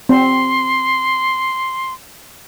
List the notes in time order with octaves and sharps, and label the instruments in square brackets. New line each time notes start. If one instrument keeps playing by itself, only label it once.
[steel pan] C4 [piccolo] C6